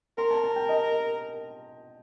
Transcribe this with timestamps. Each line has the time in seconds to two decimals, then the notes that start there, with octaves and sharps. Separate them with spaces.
0.18 A#4 C6
0.31 A5
0.43 A5
0.56 G5
0.69 D#5